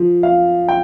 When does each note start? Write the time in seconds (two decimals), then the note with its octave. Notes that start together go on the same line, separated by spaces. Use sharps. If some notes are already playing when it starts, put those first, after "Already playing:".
Already playing: F3
0.23 F5
0.68 G5